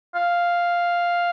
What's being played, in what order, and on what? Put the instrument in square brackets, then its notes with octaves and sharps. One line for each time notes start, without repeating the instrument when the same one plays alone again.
[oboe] F5